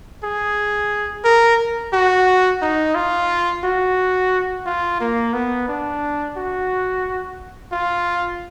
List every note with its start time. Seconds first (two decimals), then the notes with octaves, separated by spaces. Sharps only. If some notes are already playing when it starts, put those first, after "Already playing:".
0.23 G#4
1.24 A#4
1.93 F#4
2.62 D#4
2.95 F4
3.64 F#4
4.66 F4
5.00 A#3
5.33 B3
5.68 D4
6.36 F#4
7.72 F4